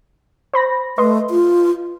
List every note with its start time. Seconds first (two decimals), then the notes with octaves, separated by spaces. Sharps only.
0.54 C5 B5 A#6
0.98 A3 B4 D#5 C6
1.30 F4